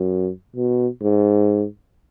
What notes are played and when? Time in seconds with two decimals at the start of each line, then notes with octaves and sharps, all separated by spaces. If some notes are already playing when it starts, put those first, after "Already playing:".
Already playing: F#2
0.56 B2
1.01 G#2